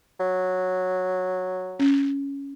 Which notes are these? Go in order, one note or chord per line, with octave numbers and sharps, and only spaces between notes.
F#3
C#4